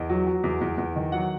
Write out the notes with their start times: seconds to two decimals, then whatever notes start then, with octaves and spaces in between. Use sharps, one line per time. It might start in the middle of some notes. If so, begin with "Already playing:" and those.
Already playing: E2 D#5
0.10 F#3
0.27 F#3
0.44 E2
0.61 E2
0.78 E2
0.96 D#3
1.12 F#3 F#5